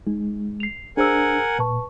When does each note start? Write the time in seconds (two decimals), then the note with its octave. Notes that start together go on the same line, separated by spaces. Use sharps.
0.07 G#3 D#4
0.60 C7 F7
0.97 D4 G#4 A#4 C5 F#5 G#5 E6
1.59 A#2 B4 A5 C#6